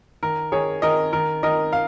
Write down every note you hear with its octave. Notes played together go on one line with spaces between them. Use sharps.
D#3 A#4
D#3 G#4 C#5
D#3 A#4 D#5
D#3 A#4
D#3 A#4 D#5
F5